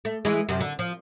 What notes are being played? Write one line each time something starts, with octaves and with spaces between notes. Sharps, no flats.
A3
E3 G#3
F#2 C3
D3
F3